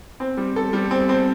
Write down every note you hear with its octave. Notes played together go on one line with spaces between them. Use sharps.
C4
G3
A4
G3
C4
C4